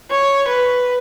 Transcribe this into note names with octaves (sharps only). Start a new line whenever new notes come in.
C#5
B4